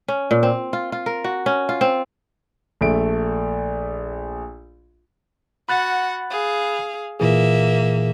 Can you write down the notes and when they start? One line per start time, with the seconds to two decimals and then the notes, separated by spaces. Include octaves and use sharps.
0.08 C#4
0.31 A#2
0.43 C4
0.73 F4
0.92 F4
1.06 A#4
1.24 F#4
1.46 C#4
1.69 F4
1.81 C4
2.81 A#1 A3 D7
5.69 F#4 F#5 B5 F#6 A6
6.30 G#4 F5
7.20 A#2 E3 A#3 G#4 E5